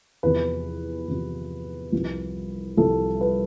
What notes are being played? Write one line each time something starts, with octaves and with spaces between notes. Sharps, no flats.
E2 C3 F3 B4
E2 C3 F3
C2 C3 F3
C2 C3 F3 A4
B4